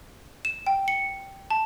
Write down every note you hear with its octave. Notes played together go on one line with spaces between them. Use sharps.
E7
G5
C#7
A5